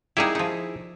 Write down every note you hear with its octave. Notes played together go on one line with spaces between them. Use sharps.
G3 A#3 D#4 E4 G#4
F3 D#4